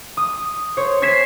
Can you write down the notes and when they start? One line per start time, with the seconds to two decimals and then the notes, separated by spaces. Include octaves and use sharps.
0.17 D#6
0.77 C5 C#5
1.02 G#6 B6 C7 E7